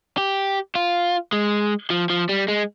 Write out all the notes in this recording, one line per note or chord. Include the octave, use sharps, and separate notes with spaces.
G4
F4
G#3
F3
F3
G3
G#3